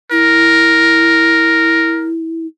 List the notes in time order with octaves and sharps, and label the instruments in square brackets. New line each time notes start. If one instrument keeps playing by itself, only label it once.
[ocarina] E4 [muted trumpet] A#4